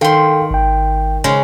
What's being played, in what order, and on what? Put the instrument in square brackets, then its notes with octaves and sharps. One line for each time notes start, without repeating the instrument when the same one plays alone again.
[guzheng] D#3 C6 [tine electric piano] A4 F5 G5
[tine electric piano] G#1 G5
[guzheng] C#3 G#3